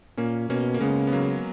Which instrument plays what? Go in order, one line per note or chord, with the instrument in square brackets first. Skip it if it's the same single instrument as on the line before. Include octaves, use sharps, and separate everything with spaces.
[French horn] A#2 [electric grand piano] A#3 C#4
[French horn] B2 [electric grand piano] A#3 C#4
[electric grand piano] A#3
[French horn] C#3 [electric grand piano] G#3 B3
[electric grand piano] B3
F#3 A#3